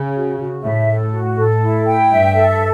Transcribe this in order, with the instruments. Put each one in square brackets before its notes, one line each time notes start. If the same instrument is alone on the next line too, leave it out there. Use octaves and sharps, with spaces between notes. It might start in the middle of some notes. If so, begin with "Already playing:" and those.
Already playing: [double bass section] C#3
[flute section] F#4
F#4
[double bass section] A2 [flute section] E5
[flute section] A4
F#4
[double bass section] A2 [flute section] A4
[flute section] E4
G5
[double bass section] G2 [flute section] E5
[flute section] A4